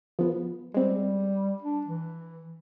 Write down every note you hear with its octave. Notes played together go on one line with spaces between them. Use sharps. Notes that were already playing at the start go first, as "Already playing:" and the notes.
F3 B3
G3 G#3 C4
D4
E3